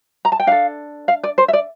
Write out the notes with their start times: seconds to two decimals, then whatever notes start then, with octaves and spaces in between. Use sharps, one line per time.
0.25 A#5
0.32 A5
0.40 G5
0.47 D4 A4 F5
1.08 F5
1.24 D5
1.38 C5
1.48 E5
1.53 D5